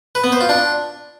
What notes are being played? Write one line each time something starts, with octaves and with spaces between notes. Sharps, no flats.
B4
B3
C5
F4
D4